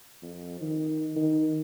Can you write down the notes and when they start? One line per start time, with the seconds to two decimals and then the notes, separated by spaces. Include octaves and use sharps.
0.23 F2
0.61 D#3
1.16 D#3